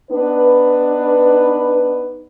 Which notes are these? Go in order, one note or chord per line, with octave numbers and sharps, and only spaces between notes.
B3 D4 D#4 B4